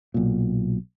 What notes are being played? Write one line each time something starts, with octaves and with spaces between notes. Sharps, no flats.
B1 A#2